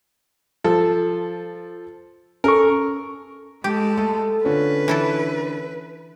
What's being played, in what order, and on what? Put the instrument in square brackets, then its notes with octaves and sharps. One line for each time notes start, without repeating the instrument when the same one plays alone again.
[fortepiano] F3 A4
[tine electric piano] C#4 A4 C#6 [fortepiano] A#4
[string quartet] G#3 A4 [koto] G4
[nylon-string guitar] A3 [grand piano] A5
[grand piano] D3 C#4 F4 [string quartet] B4
[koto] E3 E4 A4